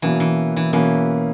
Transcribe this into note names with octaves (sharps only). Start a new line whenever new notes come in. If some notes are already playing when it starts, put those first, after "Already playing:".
B2 E3 A#3 C#4
E3
E3
B2 E3 A#3 C#4